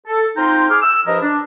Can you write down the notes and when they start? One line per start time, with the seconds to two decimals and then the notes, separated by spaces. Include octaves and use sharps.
0.07 A4
0.37 C4 D#4 F4 G5 A#5 C6
0.71 G#4 D6 F6
0.82 E6
1.07 G2 F3 E4 A#4 D#5
1.22 D4